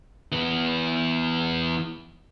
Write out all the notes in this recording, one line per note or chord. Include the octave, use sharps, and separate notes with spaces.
E3 B3